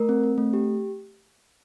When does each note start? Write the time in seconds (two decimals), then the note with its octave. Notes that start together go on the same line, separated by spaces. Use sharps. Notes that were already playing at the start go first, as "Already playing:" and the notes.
Already playing: A3 A#4
0.09 C4
0.23 C4
0.38 A3
0.53 G4